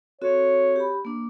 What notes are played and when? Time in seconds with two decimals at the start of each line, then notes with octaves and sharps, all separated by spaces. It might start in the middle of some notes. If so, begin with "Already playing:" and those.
0.22 C4 F#4 A4 C#5
0.76 G4 B5
1.05 A#3 D4